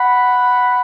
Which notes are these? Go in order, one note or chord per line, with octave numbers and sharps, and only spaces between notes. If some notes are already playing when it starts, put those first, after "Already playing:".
Already playing: F#5 B5